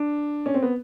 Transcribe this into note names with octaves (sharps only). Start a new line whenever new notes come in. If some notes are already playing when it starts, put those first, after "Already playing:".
Already playing: D4
C#4
C4
B3